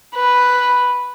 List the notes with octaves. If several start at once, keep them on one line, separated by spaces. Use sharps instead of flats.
B4